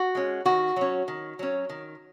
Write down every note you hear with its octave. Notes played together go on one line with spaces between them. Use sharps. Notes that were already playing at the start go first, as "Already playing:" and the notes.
Already playing: F#4
G#3 C#4
D#3 F#4
F#3 C#4
D#3
F#3 C#4
D#3